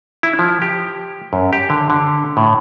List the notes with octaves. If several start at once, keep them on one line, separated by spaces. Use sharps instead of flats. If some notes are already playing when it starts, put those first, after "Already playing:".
E4
F3
G4
F#2
G4
D3
D3
A2